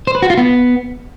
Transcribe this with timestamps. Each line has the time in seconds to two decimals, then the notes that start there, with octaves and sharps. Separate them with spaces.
0.07 C5
0.15 B4
0.22 F#4
0.30 F4
0.38 B3